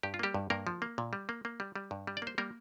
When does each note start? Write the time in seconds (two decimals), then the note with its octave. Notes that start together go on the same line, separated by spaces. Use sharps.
0.03 G2 G4
0.14 F4
0.19 G3 A#3 G4
0.34 G2
0.50 G2 A#3 A#4
0.67 F3
0.82 A#3
0.98 A#2
1.13 G3
1.29 A#3
1.45 A#3
1.60 G3
1.76 G3
1.91 G2
2.07 G3
2.17 D5
2.22 A#3 C5
2.38 G3 A#3 A#4